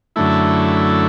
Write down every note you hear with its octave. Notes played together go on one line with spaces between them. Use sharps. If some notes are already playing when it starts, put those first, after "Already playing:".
F#2 D3 A3 E4